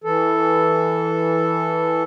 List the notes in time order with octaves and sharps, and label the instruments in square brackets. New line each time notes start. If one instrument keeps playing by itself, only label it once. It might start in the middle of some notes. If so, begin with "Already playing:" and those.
[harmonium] E3 A4